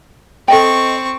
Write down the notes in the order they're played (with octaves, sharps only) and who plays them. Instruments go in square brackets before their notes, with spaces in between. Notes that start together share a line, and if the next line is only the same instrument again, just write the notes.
[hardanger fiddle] C4 C#6 [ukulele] A4 D#5 G5